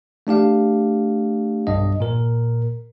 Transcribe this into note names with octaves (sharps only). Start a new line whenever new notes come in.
A3 D4 G4 F5
B1 G2 D#5
A#2 A#4